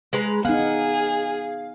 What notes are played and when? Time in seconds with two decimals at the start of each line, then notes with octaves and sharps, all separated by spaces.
0.13 G#3 B4 A#5
0.45 B3 D#4 G#4 F5 F#5